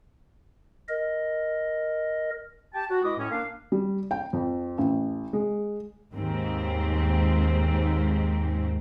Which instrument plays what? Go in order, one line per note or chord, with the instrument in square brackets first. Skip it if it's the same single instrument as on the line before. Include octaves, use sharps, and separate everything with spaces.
[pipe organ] A#4 D#5
[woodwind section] G4 G5 A5
F#4
B2 G#3 E4 D#5 D6 D#6
A2 C#4
A#3 D4 F5
[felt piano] G3
G5
F2
A1
G#3
[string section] D#2 G#2 C4